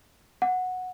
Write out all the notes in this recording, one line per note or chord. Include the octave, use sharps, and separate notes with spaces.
F#5